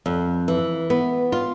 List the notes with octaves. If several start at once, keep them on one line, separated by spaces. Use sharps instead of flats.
F2
E3
B3
F4